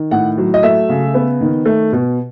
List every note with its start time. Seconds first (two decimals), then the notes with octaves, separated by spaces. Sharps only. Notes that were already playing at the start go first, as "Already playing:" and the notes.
Already playing: D#3
0.11 A2 F#5
0.38 F#3
0.54 D#5
0.63 A3 E5
0.89 C#3
1.14 B3
1.41 D#3
1.66 A3
1.92 B2